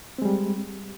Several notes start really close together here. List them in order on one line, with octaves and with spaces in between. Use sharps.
C4 G#3 G3